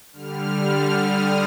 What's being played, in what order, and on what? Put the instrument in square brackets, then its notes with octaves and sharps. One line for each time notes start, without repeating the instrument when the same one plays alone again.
[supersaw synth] D3 G3 F6
D#6